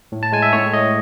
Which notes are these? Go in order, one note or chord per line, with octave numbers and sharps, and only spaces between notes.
A2
A5
G#3 G#5
E5
A2 C#5
A3 D#5